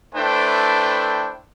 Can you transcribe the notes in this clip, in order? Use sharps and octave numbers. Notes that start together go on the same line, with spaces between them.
A3 D4 E4 B4 C5 G5